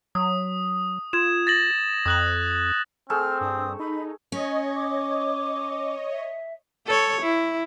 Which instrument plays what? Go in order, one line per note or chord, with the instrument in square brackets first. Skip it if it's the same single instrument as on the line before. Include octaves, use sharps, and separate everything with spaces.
[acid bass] F#3 [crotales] D#6
[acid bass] F4 [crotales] G#6 E7
[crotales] A6 A#6 F#7
[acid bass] F2 [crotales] D#6 F#6 F#7
[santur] A3 G#4 E6 [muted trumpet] C4 [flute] F6
[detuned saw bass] G2 [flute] D#6
[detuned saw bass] D#4 [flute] B5
[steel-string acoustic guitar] C#4 [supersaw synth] C#5 D#5
[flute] D6
E5
[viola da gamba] A4 C#5
E4